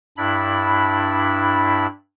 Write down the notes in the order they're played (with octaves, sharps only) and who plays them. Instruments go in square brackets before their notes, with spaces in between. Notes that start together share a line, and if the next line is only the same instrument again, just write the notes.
[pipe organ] G2 D4 E4 B5